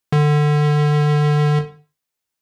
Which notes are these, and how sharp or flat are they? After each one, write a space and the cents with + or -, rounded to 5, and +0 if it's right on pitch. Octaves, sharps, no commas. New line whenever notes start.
D3 +20